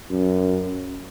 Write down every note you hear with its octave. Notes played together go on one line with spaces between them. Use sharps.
F#2